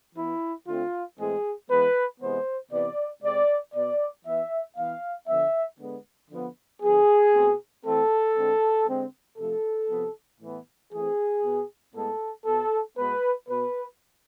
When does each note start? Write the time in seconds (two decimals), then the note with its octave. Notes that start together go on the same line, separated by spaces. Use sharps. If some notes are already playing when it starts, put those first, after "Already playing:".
0.15 E3 B3 E4
0.66 D3 A3 C4 F4
1.18 A2 E3 G#3 C4 G#4
1.69 E3 G#3 B3 B4
2.20 C3 E3 G#3 B3 C5
2.72 C3 E3 B3 D5
3.23 C3 G#3 C4 D5
3.74 B2 B3 D5
4.25 E3 B3 E5
4.77 E3 B3 F5
5.28 D3 F3 B3 E5
5.79 D3 G#3 B3
6.30 D3 F3 B3
6.82 D3 F3 B3 G#4
7.33 B2 A3 C4
7.84 E3 A3 C4 A4
8.36 D3 G#3 C4
8.87 D3 G#3 C4
9.38 C3 F3 A3 A4
9.89 C3 F3 B3
10.40 A2 E3 B3
10.92 E3 A3 C4 G#4
11.43 B2 B3
11.94 A2 G#3 B3 A4
12.46 B2 B3 A4
12.97 B2 G#3 B3 B4
13.48 B2 B3 B4